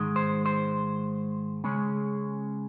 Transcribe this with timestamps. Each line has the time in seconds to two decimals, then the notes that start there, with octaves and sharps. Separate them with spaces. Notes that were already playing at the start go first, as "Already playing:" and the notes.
Already playing: G#2 D#3 G#3
0.16 C5
0.46 C5
1.64 C#3 G#3 C#4